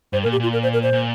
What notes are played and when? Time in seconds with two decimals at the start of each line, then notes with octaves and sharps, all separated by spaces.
0.13 G2 C5
0.23 A#4
0.26 A#2
0.32 G4
0.40 A#2 F4
0.53 A#4
0.63 C5
0.73 A#4
0.83 C5
0.93 A#2